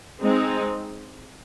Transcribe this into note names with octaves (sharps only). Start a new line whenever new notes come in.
G#3 C4 D#4